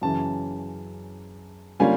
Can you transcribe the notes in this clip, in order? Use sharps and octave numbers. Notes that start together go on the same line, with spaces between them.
F#2 C#3 E3 A5
D3 G3 A#3 C#4 F4 G#5